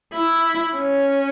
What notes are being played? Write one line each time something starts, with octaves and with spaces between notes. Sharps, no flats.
E4
C#4